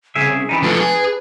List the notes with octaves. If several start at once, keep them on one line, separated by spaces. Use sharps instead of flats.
C2 C#3 G#4 E5
C#4
E3 G3 D#4
F3 A3 D4 B4
G#4